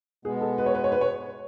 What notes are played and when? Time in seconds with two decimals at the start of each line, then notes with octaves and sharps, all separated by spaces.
0.25 B2 G#3 B3 G#4
0.41 A4
0.58 B4
0.66 C#5
0.75 B4
0.84 C#5
0.92 B4
1.01 C#5